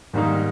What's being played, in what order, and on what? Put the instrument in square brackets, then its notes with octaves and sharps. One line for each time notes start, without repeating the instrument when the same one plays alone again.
[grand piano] G#2 D#3 G3 A#3 D#4